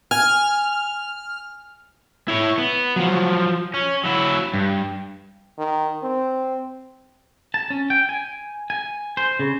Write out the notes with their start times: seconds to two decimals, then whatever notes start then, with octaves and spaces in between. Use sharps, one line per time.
0.11 G#5 F6
2.28 E4 C#5
2.58 B3
2.96 F3 F#3
3.74 C#4
4.04 F#3 E4
4.54 G2
5.58 D#3
6.03 C4
7.54 A5
7.70 C#4
7.90 G5
8.09 G#5
8.70 G#5
9.17 C5
9.39 C#3